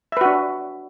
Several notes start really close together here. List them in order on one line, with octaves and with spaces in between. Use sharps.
E5 B4 F#4 D4